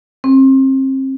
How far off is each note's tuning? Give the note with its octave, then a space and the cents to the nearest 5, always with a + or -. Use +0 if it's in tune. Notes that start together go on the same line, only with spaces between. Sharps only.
C4 +35